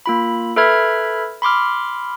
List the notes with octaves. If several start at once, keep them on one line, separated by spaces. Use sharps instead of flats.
A#3 F4 B5
A4 B4 E5 B5 F6 G#6
B5 C6 D6 F6